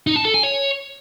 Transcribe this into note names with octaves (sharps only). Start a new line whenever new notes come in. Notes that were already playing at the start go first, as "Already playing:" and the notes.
D#4
A5
A4
G#5
C#5